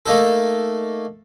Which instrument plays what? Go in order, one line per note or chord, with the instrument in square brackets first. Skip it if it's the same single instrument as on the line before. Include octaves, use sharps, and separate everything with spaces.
[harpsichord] A3 A#3 D#4 A4